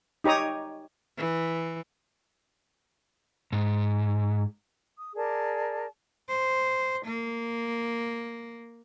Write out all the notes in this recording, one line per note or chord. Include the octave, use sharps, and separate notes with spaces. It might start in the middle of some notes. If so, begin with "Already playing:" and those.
D#4 G4 C#5 A#5 D#6
E3
G#2
D#6
G#4 A#4 D5 A5
C5
A#3